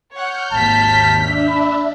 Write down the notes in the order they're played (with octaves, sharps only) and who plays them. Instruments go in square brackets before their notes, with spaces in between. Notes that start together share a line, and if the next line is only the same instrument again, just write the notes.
[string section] C#5 F#5 [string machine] F6 G6
[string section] G#1 D#2 B6 [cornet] A5
[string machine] D4 E5
[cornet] B5